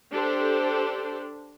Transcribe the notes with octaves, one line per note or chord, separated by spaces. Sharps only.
D4 G4 A4 C5